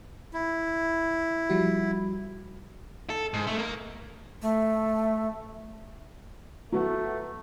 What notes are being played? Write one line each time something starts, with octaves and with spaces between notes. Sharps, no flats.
E4
F3 G3 F#4
A4
G#2
A3
A#3 A#4
A3
F#3 A3 B3 F#4